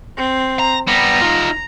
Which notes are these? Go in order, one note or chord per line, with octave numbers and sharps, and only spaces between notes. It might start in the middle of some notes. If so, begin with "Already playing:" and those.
C4
A#5
G3 B3 A#5
D#4 F4